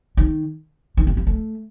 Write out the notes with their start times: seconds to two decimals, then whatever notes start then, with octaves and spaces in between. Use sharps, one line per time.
0.17 D#3
0.97 D#3
1.07 A#3
1.17 A#3
1.27 A3